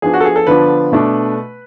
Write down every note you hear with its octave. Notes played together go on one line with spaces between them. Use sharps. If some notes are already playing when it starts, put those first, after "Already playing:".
F3 B3 D4 G#4
F#4
A4
G#4
A4
D3 F3 B3 D4 B4
B2 A3 D4